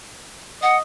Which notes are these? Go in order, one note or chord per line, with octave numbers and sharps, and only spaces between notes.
D#5 F#5